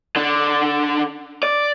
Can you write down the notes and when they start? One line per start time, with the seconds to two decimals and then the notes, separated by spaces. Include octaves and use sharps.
0.16 D3 D4
1.43 D5